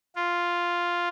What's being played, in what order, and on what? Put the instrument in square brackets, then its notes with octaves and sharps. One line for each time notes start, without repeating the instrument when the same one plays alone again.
[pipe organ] F4